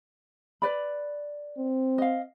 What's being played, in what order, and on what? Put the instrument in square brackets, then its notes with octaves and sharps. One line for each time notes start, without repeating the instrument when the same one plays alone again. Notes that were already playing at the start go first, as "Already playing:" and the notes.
[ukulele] B4 D5 B5
[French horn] C4
[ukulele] D#5 F5